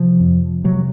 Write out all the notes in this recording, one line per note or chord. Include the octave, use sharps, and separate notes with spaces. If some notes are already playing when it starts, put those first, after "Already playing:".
Already playing: C3 F3
F2
C3 F#3